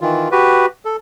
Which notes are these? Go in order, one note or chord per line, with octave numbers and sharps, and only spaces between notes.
D#3 E3 F4
F#4 G4 B4
A4